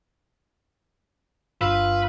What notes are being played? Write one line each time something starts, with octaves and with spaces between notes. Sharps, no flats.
G1 G2 F4 B4 E6